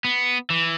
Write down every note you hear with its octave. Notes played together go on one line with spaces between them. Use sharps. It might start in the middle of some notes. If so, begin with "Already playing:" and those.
B3
E3